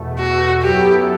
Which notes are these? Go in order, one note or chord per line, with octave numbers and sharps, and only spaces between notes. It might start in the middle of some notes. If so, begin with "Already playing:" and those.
Already playing: E2 B2 A3
F#4
F#2 F#3 B3 E4 G4 A4